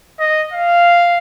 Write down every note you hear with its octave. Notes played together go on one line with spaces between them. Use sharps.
D#5
F5